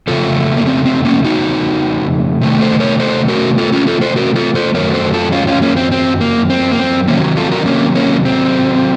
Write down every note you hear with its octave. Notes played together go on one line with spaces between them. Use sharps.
F2 C#3 A3 F4 A4
A#3
C4
C4
A#3 C#4
D#4 F#4
C3 D#3 A3
A4 C5
A#4 C#5
A4 C5
F#4 A#4
F4 A4
C#4 F4
F4 A4
A4 C5
F#4 A#4
F4 A4
A4 C5
F#2 D#3 F#3 A3 A#4 C#5
A4 C5
F4 A4
C#4 F4
C#4 F4
A#3 C#4
C4
C4
A#3
C4
A#3
C4
C3 D#3 F#3 A#3 C#4
F4 A4
F#4 A#4
D#4
A#3 C#4
A#3 C#4
C4